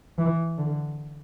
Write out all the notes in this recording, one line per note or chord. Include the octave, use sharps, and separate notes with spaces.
E3
D3